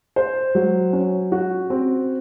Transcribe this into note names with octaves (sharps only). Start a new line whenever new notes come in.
C5
F#3
C#4
F#4
C4